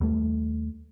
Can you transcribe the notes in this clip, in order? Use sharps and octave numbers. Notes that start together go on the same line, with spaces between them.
D#2 G3 A3